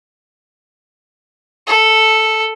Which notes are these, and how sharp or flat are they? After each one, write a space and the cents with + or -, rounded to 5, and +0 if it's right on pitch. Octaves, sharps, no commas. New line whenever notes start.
A4 +0